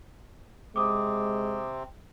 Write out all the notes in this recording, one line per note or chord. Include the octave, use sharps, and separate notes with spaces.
C3 G#3 C4 D6 D#6